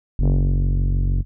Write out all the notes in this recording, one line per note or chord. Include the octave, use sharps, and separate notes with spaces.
F#1